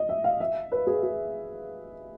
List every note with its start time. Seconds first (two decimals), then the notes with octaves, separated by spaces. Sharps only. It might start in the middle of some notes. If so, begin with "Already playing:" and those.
Already playing: D#5
0.09 E5
0.24 F5
0.40 E5
0.72 B4
0.87 G#4
1.03 G#4